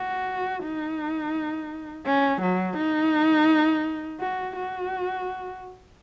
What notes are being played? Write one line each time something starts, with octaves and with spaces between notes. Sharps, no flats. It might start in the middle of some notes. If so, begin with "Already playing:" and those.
Already playing: F#4
D#4
C#4
F#3
D#4
F#4
F#4